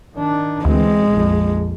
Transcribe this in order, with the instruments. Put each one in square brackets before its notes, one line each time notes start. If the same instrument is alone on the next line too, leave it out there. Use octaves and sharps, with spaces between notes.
[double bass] D#3 D4
[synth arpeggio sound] D2 [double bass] E3 C4 [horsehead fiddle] G#3
[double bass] A#1 F2